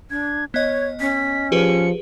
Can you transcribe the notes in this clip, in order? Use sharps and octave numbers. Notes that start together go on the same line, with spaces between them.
D4 G#6
B3 C#5 D#5 G#6
C#4 B6
F3 G4 G#4 B4 C#7